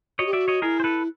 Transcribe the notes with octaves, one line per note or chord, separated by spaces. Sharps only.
F#4 C#5 D#5
G4
F#4 D5 E5
C#5 D#5
E4 G#4 A#4
C5
A4 B4